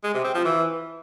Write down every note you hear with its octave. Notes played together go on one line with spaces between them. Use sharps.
G#3
C3
C4
F3
E3